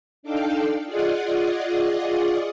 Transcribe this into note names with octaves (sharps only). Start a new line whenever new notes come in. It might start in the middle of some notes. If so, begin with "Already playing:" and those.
D4 D#4 A4 D5 F5 G5
F4 G#4 D5 D#5 F#5